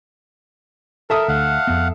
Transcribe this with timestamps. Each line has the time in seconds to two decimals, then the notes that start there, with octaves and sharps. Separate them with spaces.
1.10 A4 A#4 E5 D#6
1.28 D2 F5 F#5
1.67 F2 B3